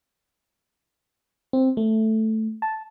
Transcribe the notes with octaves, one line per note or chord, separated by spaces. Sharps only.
C4
A3
A5